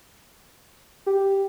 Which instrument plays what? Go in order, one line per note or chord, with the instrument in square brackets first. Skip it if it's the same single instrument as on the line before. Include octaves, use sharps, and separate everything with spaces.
[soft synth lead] G4